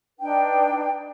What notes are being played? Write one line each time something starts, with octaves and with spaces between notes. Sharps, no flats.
D4 D#4 B4 G5